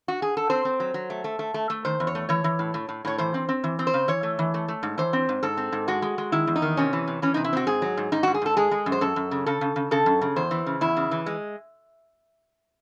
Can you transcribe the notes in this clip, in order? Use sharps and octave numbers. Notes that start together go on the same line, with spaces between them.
F#4
G#4
A4
C4 C5
C4
F#3
F#3
A3
A3
A3
A3
A3
D#3 C5
E2
C#5
A3
E3 C#5
E3
A2
A2
A2
A2 C#5
E3 C5
C4
C4
E3
C4
C5
C#3
E3 C#5
A3
E3
A3
A3
G#2
E3 C5
C4
G#2
G#2 A4
C4
G#2
G#3 F#4
G#3
G#3
D#3 E4
E2
D#4
D#3
C3 C#4
E3
C3
E3 C#4
C3 D#4
E4
C4 F#4
G#2 G#4
F#3
G#2
G#2 D#4
G#2 F#4
G#4
G#2 A4
G#3 G#4
G#3
F#2
C5
F#2 A4
F#2
C#3
C#3 A4
C#3
C#3
C#3 A4
F#2
C#3
E2 C5
E3
C#3
E2 E4
C#3
E3
G#3